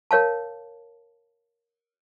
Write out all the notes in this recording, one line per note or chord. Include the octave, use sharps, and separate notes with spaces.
A#4 C#5 F5 A5